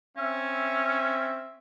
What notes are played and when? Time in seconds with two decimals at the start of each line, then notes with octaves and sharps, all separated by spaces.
0.17 C4 C#4 E5